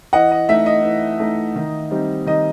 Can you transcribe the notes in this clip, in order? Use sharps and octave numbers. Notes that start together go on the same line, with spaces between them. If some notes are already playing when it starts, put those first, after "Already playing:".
E3 D#5 F#5
D#5
A3 D#4 E5
D#5
E3
A3 D#4
D#3
G3 C4 D#4
D#3 D#5